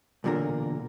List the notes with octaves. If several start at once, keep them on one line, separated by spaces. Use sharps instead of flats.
B1 E2 A#2 D3 A#4